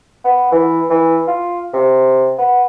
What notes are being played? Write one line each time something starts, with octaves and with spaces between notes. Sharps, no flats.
B3
E3
E3
F4
C3
B3